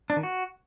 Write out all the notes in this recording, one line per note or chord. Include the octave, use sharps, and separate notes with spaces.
D4
D#3
F#4